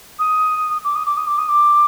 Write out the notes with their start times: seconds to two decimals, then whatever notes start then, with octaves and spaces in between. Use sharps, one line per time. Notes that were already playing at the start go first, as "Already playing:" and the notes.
0.19 D#6
0.84 D6
0.95 D#6
1.05 D6
1.16 D#6
1.27 D6
1.38 D#6
1.48 D6